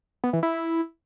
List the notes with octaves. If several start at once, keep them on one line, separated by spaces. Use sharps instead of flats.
B3
E3
E4